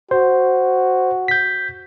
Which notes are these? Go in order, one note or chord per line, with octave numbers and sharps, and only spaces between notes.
F#4 C5
G6 B6